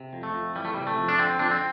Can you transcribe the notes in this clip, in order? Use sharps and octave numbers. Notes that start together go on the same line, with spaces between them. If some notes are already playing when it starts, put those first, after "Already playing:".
Already playing: C3
F2
A3
F2
E3 G3
A3
C3 G3
A3
F2
D4
D3 C4
F2 D4
C4